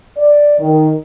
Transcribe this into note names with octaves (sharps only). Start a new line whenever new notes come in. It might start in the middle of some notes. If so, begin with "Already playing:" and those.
D5
D#3